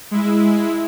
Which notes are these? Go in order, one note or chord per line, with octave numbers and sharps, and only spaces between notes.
G#3 E4